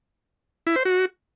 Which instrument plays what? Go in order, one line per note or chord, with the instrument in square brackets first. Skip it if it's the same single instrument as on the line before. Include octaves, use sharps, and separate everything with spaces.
[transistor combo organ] E4
C5
F#4